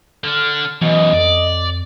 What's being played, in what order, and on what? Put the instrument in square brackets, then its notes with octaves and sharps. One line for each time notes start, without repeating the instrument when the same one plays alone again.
[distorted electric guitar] D3 D4 [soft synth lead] F6
[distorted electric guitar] F#2 B2 [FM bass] E3 [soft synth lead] D#5
[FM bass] F2 [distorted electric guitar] D5